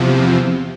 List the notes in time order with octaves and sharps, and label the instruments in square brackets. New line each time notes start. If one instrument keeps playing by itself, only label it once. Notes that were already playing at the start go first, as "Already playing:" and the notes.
Already playing: [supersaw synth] E2 C3 F3